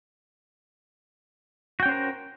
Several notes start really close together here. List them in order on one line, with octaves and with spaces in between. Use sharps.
F#4 G5 C#4 C5 A#4